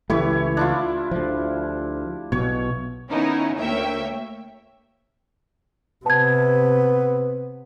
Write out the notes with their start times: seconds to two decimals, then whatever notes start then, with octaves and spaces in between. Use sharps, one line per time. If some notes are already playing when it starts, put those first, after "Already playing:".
0.10 C#2 E3 A3 E4 G4 C#5
0.57 D4 E4 F4
1.11 D2 F3
2.32 B1 B2 C#5
3.09 D#3 B3 C#4 D#4 E4
3.58 D2 A#3 C#5 E5 G5
6.06 C3 B3 A5 G#6